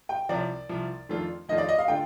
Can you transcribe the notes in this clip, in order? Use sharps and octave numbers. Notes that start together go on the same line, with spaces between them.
G5
C2 C3 F3 D5
C2 C3 F3
F2 D#3 A3 D4 F4
F2 D#3 A3 D4 F4 D#5
D5
D#5
F5
D3 A3 D4 F4 G5